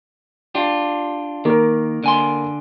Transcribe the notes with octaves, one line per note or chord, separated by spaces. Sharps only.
D4 F4 G4
D#3 A#3 A#4
D3 G#5 C6